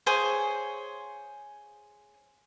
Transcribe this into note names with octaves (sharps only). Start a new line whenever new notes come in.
G#4 C5 C#5 F5